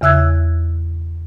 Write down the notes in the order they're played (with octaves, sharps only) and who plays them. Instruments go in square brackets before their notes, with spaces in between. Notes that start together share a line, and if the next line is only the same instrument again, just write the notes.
[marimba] E2 C#3 E5 E6 F#6 G#6